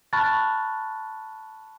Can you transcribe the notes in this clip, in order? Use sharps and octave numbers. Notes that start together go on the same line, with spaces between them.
A5 B5 C#6 F6 F#6 A6